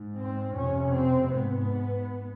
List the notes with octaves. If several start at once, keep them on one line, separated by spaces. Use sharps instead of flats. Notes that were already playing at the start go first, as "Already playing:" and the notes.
Already playing: G#2
C4
F2 C3 C#4
C4
G#2 B3